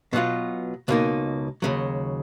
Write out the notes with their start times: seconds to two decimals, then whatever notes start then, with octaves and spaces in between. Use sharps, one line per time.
0.13 B2 F#3 B3 F4
0.88 C#2 B2 A#3 D#4
1.62 D#2 C#3 F#3